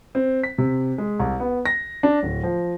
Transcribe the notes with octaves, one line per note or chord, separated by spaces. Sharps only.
C4
B6
C3
G#3
C2
B3
A#6
D4
D1
F3